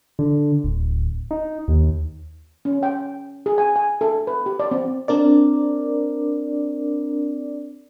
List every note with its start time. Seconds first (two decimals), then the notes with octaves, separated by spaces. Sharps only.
0.19 D3
0.64 D1
1.31 D#4
1.68 D#2
2.65 C#4
2.83 G5
3.46 G#4
3.58 G#5
3.76 G#5
4.01 A4
4.27 B4
4.46 G4
4.60 D5
4.71 C4
5.08 C4 D4 A#4 D5